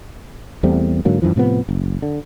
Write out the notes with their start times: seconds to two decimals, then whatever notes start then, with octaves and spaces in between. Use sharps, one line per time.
0.63 E2 G3 A3 C4
1.05 G#2 D3 F#3 A#3
1.22 F#2 A#2 E3 F3
1.36 A2 C3 F3 B3
1.69 F#1
2.02 D3